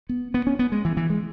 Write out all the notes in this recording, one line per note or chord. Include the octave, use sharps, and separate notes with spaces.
B3
B3
C#4
B3
G#3
E3
E3
G#3